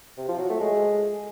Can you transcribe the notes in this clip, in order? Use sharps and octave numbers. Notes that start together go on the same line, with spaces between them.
C3
F3
F#3
A3
G#3